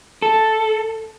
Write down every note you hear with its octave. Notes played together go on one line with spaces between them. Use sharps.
A4